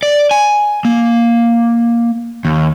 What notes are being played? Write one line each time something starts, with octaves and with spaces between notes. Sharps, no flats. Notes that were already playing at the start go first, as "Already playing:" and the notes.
D5
G#5
A#3
D#2